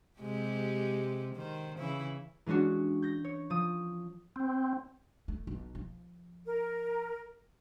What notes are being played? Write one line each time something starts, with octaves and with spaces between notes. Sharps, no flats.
C3 G#3 G4
D#3 C5
C#3 E3 E4
E3 G#3 C#4 D4 F#4
G6 A#6
C#5
F3 D#6
C4
A3
B1
F3
A#4